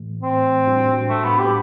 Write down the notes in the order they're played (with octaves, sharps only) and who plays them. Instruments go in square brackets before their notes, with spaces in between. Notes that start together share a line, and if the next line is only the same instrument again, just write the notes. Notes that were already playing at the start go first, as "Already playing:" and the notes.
Already playing: [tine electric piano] A2 E3 A3
[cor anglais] C4
[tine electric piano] A2 G3 D4 F#4
[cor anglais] A3
B3
G4